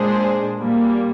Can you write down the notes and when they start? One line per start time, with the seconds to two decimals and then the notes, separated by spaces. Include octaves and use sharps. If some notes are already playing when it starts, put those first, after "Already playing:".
Already playing: A#2 G#3 D4 G#4 C5
0.59 A#2 G3 A#3